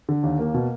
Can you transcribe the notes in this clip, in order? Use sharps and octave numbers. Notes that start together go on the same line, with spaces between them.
D3
D#2
A#3
B2